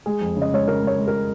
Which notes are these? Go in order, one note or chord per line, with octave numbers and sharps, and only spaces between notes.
G#3 G#4
F2
C#3
D#5
G#3 C#5
C#3 A#4
G#3 C#5
G#3
A#4